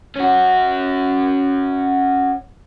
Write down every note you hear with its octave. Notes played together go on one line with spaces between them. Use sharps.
C#4 F#4